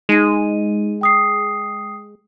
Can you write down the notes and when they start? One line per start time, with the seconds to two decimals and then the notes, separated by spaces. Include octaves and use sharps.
0.09 G#3 D#4 D#7
1.01 G5 D#6 C7